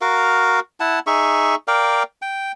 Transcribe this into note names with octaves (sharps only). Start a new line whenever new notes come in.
F#4 A#4 F5
E4 F#5 A5
D#4 G#4 E5 C#6
A#4 D5 F5 G5
G5